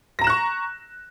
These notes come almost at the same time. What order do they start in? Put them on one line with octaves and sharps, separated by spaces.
A#6 A#5 E7 F#6 C#6